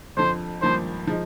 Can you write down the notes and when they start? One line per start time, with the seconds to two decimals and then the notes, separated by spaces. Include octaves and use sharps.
0.17 F2 D3 F3 C5
0.62 G#1 G2 F3 A#3 C5
1.07 F3 G#3 D#4